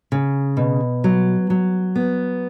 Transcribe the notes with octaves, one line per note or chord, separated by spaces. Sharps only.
C#3
B2
F#3
F#3
B3